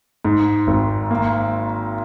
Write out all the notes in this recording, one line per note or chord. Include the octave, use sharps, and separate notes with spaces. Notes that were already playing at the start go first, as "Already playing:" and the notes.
G#2
G#1
A#3